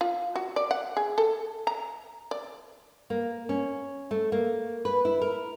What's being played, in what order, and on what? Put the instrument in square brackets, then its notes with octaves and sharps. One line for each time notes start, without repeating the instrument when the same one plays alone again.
[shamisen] F4
F#4
D5
F#5
G#4
A4
A#5
D5
[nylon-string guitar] A#3
C#4
A3
A#3
B4
E4
A#4